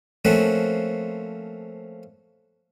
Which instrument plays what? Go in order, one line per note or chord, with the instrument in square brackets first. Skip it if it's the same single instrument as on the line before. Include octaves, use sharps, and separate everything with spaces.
[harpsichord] F3 A3 A#3 C4 C#4 F#4